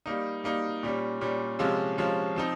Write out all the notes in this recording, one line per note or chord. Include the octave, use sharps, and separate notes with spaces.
G3 A#3 D#4
G3 A#3 D#4
A#2 G3 C#4
A#2 G3 C#4
C3 F3 G#3 C#4 F4
C3 F3 G#3 C#4 F4
F3 C4 D#4